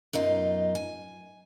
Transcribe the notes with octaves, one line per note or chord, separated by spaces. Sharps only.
F#2 B2 D#4 F4
G#5